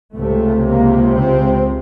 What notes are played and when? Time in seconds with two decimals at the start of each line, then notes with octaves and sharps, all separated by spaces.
0.14 C#2 C3 A3
0.64 A#3
1.14 C4